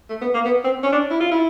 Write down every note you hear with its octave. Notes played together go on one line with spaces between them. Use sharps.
A3
B3
A#3
B3
C4
C#4
D4
E4
F4
E4